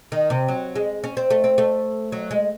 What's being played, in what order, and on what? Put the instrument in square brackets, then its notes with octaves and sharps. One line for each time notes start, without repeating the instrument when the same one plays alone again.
[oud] D#3
C3
F#3
G#3
C#4
C4
A3
C4
A3
F#3
G#3